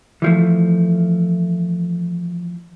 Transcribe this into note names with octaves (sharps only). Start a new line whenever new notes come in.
E3 F3 A3